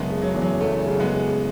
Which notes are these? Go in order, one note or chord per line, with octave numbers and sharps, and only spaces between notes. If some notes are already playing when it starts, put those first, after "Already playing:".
Already playing: F#1 G#3 B3
C#3
F#3
E2
F#3
E2 F#3 A3
C#3
G#3 B3
C#3